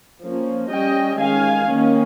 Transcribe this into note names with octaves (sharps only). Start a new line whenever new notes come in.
F3 A#3 C#4
G3 C#4 D#5 G5
D#3 G#3 C#4 F5 G#5
D#3 A#3 C#4